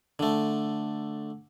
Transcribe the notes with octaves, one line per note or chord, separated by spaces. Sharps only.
D3 A3